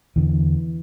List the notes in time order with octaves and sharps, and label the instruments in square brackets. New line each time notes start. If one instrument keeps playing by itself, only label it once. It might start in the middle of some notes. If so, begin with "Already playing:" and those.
[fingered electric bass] E2 D3 E3